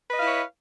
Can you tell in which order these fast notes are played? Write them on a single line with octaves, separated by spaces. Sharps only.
B4 D#5 F5 E4 C#5